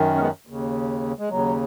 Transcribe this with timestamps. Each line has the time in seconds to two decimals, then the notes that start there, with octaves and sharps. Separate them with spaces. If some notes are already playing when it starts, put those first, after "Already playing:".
Already playing: F#2 D#3
0.15 C#4
0.19 G#3 B3
0.47 D#2 C#3
1.19 G#3
1.29 D#2 C#3 F#3